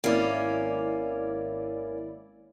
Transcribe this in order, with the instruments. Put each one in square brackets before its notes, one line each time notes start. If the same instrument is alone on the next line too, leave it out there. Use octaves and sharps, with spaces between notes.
[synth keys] G#1 E4 D5 [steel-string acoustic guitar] A#3 C#4